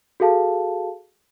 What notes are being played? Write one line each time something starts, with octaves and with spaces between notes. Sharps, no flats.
F#4 G#4 A4 F5 A5